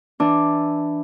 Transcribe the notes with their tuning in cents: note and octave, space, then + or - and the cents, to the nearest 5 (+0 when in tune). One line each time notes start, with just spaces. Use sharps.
E3 +0 D4 +0